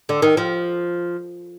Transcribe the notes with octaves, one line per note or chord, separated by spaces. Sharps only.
D3
D#3
F3